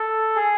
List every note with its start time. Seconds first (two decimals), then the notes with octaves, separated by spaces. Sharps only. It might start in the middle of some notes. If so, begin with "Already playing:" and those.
Already playing: A4
0.36 G#4